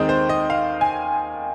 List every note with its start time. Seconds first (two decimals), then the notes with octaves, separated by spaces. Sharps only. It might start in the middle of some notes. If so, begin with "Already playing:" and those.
Already playing: D#2 D#3 G#3 C4 D#5
0.09 C5
0.29 D#5
0.50 F5
0.81 G#5